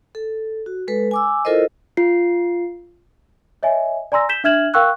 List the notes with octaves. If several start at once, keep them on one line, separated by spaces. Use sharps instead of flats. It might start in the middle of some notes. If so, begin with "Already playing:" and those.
A4
F#4
G#3 A4 B4
G#5 D6 E6
E4 F4 A4 A#4 C5 D#5
F4 C7
C#5 D#5 E5 G#5
D5 G#5 A#5 C6 E6 A#6
G6 B6 E7 G7
D4 E5 F6 G#6 E7 F#7
A#4 F5 G5 C#6 E6 F#6